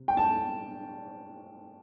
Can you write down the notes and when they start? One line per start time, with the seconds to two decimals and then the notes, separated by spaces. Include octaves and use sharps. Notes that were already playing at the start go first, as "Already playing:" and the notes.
Already playing: C3
0.08 G5
0.17 A5